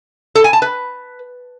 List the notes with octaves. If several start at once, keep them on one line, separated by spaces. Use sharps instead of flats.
A4
G#5
A5
B4